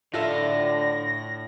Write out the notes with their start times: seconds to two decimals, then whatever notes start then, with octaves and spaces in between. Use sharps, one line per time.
0.14 A2 D3 F4 A4 E5 A#6